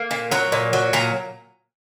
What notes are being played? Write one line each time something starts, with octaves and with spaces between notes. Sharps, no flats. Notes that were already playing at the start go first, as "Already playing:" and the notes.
Already playing: A#3
A#2
F#3 A#5
A#2
F#3
A#2 A#5